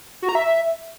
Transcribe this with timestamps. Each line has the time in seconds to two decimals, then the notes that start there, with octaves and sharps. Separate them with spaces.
0.22 F#4
0.29 A#5
0.35 E5